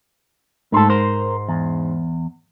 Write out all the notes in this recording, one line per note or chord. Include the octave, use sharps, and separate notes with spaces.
G#2 A3 A4 C6
A#4 C5
E2